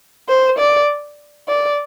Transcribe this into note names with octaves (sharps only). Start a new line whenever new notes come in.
C5
D5
D5